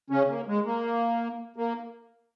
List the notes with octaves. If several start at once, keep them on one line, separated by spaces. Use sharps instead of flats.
C#3 C#4
A#3
G#3
A#3
A#3